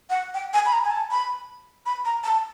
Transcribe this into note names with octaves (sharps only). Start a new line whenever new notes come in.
F#5
G5
G#5
B5
A#5
G#5
A5
B5
B5
A#5
A5